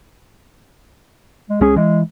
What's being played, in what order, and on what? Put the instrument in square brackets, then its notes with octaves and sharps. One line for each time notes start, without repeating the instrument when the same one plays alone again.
[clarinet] G#3
[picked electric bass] C2 G#3 C#4 [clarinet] G#4
[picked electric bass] E3 [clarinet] G#3